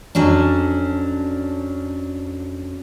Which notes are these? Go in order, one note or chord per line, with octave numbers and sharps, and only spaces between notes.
F2 F#3 C#4 D4